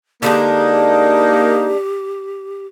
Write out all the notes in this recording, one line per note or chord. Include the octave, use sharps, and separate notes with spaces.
D3 G#3 A#3 D4 D#4 G4